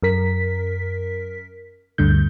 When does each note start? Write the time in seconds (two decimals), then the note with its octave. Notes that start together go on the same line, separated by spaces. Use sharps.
0.03 F#2 A#4 B6
1.98 D2 G2 D3 G6